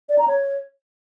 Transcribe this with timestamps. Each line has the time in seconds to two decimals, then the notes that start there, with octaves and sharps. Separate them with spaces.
0.09 D5
0.18 A#5
0.28 C#5